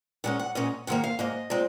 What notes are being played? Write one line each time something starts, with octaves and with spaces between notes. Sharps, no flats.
A#2 G#3 C#4 F#5
F#5
A#2 G#3 C#4 D#5
G#2 D#3 A#3 F#5
F5
G#2 D#3 A#3 D#5
A#2 G#3 C4